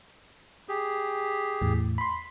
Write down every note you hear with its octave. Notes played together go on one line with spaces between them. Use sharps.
G4 G#4
E2 A2
B5 C6